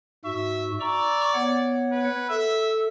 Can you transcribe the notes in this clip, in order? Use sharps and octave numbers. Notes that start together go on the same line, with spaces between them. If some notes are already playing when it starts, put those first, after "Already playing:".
G#2 F#4 E5
D5 A#5 C#6 E6
B3 C#5 F#5
B4
A4 E5